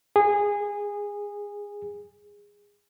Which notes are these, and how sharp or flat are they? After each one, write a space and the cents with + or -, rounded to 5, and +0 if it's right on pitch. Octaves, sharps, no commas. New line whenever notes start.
G#4 -20